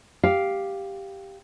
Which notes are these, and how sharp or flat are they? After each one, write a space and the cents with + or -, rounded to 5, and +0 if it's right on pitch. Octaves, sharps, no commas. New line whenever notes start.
G4 +0 F5 +0